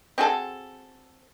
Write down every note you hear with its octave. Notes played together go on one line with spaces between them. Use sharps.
C4 F#4 G#4 A4